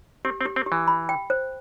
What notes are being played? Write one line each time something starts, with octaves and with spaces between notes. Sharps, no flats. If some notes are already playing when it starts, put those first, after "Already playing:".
C4 G4
C4
G4
C4
G4
E3
B5
G5
C5